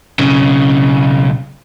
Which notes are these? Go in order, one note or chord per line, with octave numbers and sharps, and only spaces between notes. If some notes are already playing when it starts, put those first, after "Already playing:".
B1 C#3